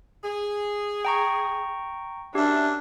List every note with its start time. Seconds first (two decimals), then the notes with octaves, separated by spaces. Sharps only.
0.23 G#4
1.05 G5 A#5 C#6
2.35 F#2 D4 G4 E5